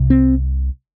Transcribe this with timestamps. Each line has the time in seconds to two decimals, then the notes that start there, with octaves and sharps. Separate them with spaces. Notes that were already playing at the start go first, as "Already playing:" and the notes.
Already playing: C2 C3
0.10 C4